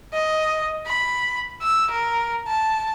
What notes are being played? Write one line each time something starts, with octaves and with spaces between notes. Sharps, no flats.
D#5
B5
E6
A#4
A5